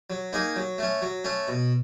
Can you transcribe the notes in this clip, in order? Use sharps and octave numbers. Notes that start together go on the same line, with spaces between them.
F#3
A#3 D#4 G#4
F#3
A3 C#4
F#3
A3 C#4
B2